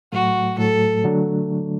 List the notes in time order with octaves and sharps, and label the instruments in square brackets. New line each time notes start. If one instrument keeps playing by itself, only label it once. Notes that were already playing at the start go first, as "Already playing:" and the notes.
[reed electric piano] A2 F#3 A3 [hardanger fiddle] F#4
[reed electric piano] A2 F#3 A3 [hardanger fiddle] A4
[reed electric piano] D3 F#3 A3 D4